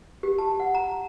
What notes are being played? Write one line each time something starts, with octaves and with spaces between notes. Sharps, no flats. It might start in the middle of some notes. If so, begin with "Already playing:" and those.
G4
A5
F#5
A#5